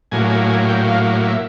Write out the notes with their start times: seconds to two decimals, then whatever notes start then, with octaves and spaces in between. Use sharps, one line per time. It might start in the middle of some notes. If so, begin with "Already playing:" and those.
0.12 A2 F#3 A#3 G#5
0.31 G#5
0.49 G#5
0.69 G5
0.87 F5
1.25 E5